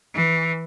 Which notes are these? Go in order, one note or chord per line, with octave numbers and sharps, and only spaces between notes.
E3